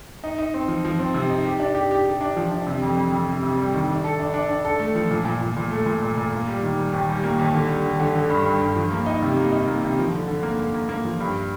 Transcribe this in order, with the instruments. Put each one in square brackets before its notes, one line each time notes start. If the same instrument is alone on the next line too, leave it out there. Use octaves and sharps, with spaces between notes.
[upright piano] D#4
D#4
C4
F3
F3
C4
C3
D#4
G4
D4
G4
G4
G4
D4
F3
D4
C3
F2
F2
F2
C3
C3
G3
D#3
D4
A4
D4
D4
D4
A4
A3
F3
A#2
A#2
A#2
A#2
A3
A#2
A#2
A#2
A#3
G3
D#3
G3
D#2
G3
A#3
D#2
D3
G3
D3
D3
D3
G2
G2
G2
F3
A#3
D#4
C3
A#3
D#4
A#3
C3
F3
D3
D3
A#3
A#3
A#3
A#3
F3
G2